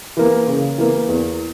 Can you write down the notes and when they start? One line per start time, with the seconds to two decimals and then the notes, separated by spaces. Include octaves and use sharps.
0.17 E3 A#3
0.47 C#3
0.78 E3 A#3
1.08 E2